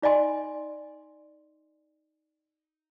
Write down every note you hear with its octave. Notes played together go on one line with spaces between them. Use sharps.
D#4 D5 D#5 G#5 C6